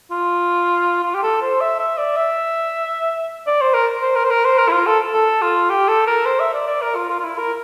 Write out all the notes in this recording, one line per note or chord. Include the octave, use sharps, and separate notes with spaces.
F4
F4
G4
A4
C5
E5
E5
D5
E5
D5
C5
A#4
C5
A#4
C5
A#4
C5
A#4
E4
F4
A4
A4
F4
G4
A4
A#4
C5
E5
D5
D5
A#4
F4
F4
F4
E4
A#4